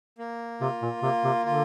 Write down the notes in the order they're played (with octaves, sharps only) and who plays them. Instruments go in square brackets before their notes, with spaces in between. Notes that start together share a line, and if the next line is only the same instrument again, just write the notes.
[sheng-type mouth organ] A#3
[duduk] C3 [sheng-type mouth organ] F4
[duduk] A#2
[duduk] C3 [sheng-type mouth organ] A#3
[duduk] C3
[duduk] D3 [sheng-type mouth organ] F4